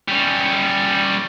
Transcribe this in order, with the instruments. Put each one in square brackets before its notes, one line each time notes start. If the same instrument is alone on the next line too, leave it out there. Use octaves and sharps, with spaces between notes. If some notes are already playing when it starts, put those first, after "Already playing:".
[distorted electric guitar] G3 C#4